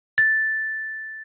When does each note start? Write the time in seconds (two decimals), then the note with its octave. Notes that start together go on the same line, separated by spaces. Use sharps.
0.18 A6